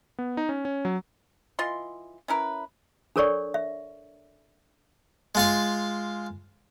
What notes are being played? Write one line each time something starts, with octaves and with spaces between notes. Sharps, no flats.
B3
D#4
C#4
C#4
F#3
E3 F4 D#5 C6
C#4 E4 A#4 B4
D4 A4 A#4 C#5 D5 C#6
E5
G#3 F4 F5